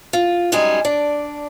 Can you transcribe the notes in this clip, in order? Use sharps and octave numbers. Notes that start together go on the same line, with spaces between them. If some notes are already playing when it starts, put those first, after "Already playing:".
F4
F#2 G3 G#3 D#4 G#4 G#5
D4 D5